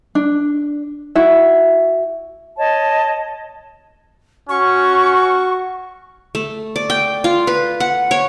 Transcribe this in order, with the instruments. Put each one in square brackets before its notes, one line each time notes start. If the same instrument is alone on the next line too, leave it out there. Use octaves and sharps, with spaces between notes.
[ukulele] D4
E4 F#4 E5
[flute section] C#5 D#5 A5
[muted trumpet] C#4 [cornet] F#4 [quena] C#6
[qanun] A3
D5
G5
F4
B4
F#5
C#5